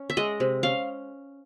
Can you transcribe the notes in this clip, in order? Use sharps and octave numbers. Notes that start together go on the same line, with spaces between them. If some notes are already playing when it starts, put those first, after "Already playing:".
Already playing: C#4
E5
G#3 D#5
C3
C#4 F5